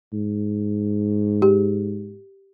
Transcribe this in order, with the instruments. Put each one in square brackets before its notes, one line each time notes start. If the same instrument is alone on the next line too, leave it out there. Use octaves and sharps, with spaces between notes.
[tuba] G#2
[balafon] G4